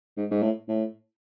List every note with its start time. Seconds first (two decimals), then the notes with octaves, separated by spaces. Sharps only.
0.17 G#2
0.31 G#2
0.42 A2
0.68 A2